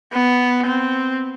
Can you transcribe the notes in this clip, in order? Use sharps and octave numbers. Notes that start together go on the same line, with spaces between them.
B3
C4